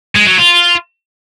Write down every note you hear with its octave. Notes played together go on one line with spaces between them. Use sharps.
G#3
F#3
F4